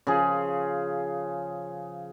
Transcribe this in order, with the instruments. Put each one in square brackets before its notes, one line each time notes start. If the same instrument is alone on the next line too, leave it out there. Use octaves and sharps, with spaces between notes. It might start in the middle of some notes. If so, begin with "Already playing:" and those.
[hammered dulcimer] C#3 F3 G#4